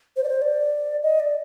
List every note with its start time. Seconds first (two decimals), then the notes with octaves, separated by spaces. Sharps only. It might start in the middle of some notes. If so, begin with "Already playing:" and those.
0.17 C5
0.24 D5
0.29 C5
0.42 D5
1.03 D#5
1.20 D5